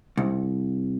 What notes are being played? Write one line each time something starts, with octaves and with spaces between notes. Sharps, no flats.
C2